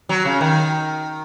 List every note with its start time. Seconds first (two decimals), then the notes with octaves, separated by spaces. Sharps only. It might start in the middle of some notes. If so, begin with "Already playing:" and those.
0.09 F#3
0.25 C#3
0.41 D#3